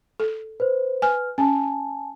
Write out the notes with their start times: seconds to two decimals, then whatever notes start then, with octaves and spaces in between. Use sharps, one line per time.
0.20 A4
0.60 B4 C5
1.02 B4 G#5 F6
1.38 C#4 G#5 A5